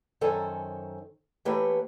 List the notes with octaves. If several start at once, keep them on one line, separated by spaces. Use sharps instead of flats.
F#2 D#3 A4 C5 C#5 G#5
E3 A3 A#3 G4 B4 C#5